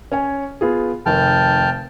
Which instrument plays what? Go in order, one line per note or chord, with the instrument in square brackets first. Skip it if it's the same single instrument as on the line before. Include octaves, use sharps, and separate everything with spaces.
[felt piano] C#4 C#5 G#5
B3 F4 G#4
[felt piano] F1 D#3 [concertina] G5 A5 F6